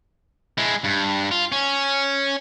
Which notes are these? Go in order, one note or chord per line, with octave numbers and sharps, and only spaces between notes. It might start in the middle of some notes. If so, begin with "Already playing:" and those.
G#3 E4
G2
F4
C#4